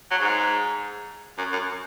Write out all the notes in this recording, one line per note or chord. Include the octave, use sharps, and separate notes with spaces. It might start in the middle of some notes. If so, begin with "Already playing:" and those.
F#3
G#2
F#2
F#2